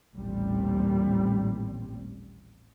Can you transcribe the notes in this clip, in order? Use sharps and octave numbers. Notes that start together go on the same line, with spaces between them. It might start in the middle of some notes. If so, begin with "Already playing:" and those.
A1 D#2 A#2 G3 C4